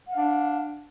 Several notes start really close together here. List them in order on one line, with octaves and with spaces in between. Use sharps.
F#5 F5 D4